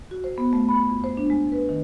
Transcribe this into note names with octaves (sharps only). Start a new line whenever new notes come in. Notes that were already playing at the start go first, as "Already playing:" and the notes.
F#4
C5
B3
A3
B5
F2
C5
D4
G#3
B4
D#3